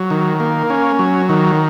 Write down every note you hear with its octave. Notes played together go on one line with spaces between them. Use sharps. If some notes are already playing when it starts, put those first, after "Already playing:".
Already playing: F#3
D#3
A#3
C#4
F#3
D#3